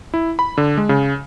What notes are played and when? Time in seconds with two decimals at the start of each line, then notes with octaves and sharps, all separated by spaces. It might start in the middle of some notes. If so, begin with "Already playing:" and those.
0.14 E4
0.39 B5
0.58 D3
0.77 G#3
0.89 C#3